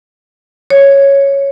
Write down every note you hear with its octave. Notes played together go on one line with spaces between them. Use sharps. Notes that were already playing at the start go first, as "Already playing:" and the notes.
C#5